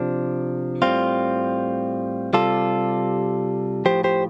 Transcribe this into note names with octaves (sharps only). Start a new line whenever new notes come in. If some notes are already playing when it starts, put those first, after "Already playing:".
Already playing: C3 F3 D4
A2 G3 C4 F4
C3 G3 F4 A4
A2 F3 G4 C5
G4 C5